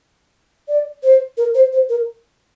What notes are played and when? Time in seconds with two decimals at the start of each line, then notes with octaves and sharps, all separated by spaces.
0.68 D5
1.03 C5
1.37 A#4
1.55 C5
1.73 C5
1.89 A#4